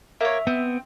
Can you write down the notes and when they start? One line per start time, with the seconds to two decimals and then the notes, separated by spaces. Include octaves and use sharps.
0.21 A#3 C#5 E5
0.47 B3 C4